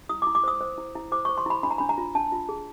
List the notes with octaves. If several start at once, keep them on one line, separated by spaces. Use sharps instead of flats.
E4 D#6
D6
E4
D6
C5 D#6
C5
E4
E4
C5 D6
C5 C#6
C6
E4 B5
D4 B5
A#5
D4 B5
A#5
F4
D4 A5
F4
G#4